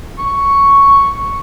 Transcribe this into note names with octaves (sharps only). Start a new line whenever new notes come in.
C#6